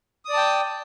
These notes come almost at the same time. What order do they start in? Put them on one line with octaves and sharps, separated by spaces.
D#6 D5 A5 G5